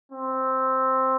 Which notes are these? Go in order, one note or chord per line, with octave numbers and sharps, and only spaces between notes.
C4